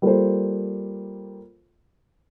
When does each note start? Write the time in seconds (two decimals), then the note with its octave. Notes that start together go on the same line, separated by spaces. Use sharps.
0.02 G3 A#3 F4 A4 C5